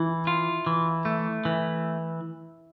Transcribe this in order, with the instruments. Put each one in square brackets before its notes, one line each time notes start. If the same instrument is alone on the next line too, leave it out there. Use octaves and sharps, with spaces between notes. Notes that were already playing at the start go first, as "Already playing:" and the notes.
Already playing: [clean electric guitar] E3 [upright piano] E4
[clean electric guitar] F4
E3
A3
E3